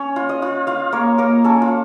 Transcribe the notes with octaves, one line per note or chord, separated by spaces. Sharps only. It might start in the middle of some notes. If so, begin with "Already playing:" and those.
Already playing: C#4 C#5
F4
D#5
F4
F4 F5
A#3 C#5
A#3 A#4
C#4 A4
F4